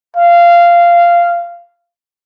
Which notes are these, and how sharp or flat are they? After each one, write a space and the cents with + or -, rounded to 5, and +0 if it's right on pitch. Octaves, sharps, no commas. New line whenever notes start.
F5 -15